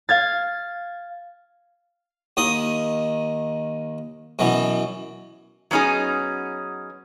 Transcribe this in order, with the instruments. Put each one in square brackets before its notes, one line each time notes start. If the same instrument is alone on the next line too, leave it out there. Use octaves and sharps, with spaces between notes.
[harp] F5 G#6 A6
[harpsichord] D#2 D#3 D#6
F#2 B2 E3
[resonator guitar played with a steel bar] F#3 B3 C#4 D#4 G#4